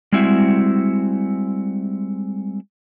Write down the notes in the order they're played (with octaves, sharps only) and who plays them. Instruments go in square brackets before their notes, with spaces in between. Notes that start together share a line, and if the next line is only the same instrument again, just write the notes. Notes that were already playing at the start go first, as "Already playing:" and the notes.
[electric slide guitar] G3 G#3 C4 E4 F#4 E5